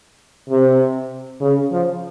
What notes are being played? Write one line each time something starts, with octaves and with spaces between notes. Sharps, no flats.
C3
C#3
F3